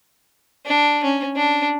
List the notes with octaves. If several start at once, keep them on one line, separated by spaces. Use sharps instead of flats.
D4
C#4
D4